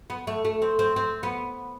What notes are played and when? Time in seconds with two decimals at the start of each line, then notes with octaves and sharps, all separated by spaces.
0.10 B3
0.27 A3
0.45 A3
0.62 C4
0.79 C4
0.96 C4
1.23 B3